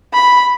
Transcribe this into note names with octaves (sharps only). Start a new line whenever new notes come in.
B5